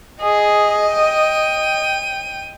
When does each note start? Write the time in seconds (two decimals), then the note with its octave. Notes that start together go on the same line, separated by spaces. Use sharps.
0.21 G#4 D#5
0.94 G5 D#7